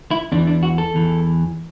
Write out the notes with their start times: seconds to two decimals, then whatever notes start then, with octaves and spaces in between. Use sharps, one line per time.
0.11 E4
0.32 E2 D4
0.35 E3
0.47 D4
0.63 F#4
0.78 A4
0.94 E2 E3